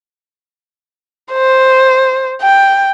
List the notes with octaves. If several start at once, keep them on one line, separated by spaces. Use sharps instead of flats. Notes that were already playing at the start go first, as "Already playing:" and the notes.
C5
G5